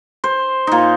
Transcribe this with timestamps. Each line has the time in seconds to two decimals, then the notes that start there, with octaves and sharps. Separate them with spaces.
0.24 C5
0.67 A#2 D#4